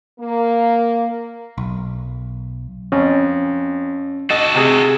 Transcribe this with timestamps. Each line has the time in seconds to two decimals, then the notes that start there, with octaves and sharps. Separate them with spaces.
0.20 A#3
1.58 B1
2.92 F2 C#4
4.30 F#4 A4 D#5
4.55 C3 G#4